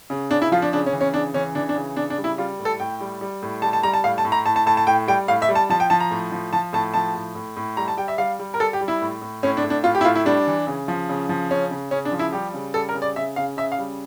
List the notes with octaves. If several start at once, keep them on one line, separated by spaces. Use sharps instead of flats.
C#3
C#3 D4
E4
F3 F4
D4
C#3 D4
C#4
E3
C#4
C#3 D4
E3 C#4
E3 D4
D4
C#3
C#3 D4
D4
G3
E4
G3 F4
A2
A4
A2 G5
G3
G3
A2
G3 A5
A5
G3 A#5
A5
A2 F5
A5
A2
A#5
A2 A5
A5
A2 A5
A5
A2 G5
G3 G5
A2 F5
E5
G3
A5
F3 A5
G5
F3 A5
A#5
A2
F3
F3 A5
A2 A5
F3 A5
A2
A2
A2
G3 A#5
A5
G3 G5
E5
G3 F5
G3
A#4
G3 A4
G4
G3
E4
A2
A2
A2 C#4
D4
A2
D4
A2 F4
G4
E4
A2 F4
E4
G3 D4
E3
C#3
F3
C#3
F3
C#3 C#4
C#3
C#3 C#4
D4
F3
E4
G3 G4
C#3
G3 A4
A#4
C#3
D5
C#3 E5
C#3 F5
C#3 E5
F5
G3